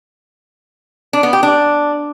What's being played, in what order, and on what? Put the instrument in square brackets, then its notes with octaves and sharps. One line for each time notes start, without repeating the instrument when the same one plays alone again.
[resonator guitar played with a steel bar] D4
B3
G4
D4